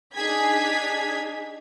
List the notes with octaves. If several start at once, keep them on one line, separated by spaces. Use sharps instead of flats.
D4 D#4 G#4 G#6 B6